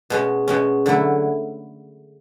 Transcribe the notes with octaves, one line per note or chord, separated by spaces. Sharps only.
B2 G#3 C#4
B2 G#3 C#4
D3 F#3 A3 E4